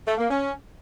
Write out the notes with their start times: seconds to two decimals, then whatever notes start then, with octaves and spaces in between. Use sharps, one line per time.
0.06 A3
0.18 A#3
0.29 C#4